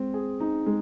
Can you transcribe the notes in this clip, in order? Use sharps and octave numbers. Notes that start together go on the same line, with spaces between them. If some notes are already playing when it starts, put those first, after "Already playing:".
Already playing: G#3 C4
G#4
D#4
G#3